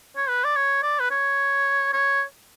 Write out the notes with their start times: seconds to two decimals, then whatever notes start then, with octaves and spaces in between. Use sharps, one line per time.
0.17 C#5
0.29 B4
0.44 D5
0.56 C#5
0.83 D5
1.00 B4
1.11 C#5
1.93 C#5